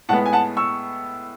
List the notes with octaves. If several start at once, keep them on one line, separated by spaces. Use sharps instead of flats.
A2 G#3 B3 F#5 A5
G#5
F#5 A5
C#6 E6